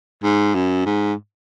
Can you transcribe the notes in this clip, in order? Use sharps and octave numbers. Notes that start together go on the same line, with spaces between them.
G#2
F#2
G#2